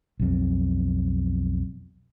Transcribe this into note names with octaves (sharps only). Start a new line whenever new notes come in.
B1 F2